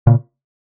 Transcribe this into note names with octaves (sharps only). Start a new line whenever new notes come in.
A#2 C#3